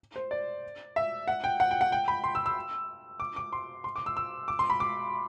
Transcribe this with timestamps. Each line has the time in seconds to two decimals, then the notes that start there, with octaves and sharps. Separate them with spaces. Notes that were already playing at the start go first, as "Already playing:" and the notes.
0.16 C5
0.31 D5
0.96 E5
1.28 F#5
1.44 G5
1.60 F#5
1.71 G5
1.81 F#5
1.92 G5
2.08 B5
2.24 C6
2.35 E6
2.46 E6
3.20 D6
3.36 D6
3.53 C6
3.84 C6
3.96 D6
4.06 E6
4.17 E6
4.48 D6
4.59 C6
4.70 B5
4.80 D6